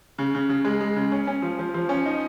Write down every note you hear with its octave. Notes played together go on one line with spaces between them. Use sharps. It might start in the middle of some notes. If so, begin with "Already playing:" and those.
C#3
C#3
C#3
G#3
G#3
C#3
C#4
C#4
F3
F3
F3
C#4
D#4